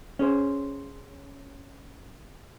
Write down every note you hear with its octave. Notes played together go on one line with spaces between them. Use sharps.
C#4 G#4 C5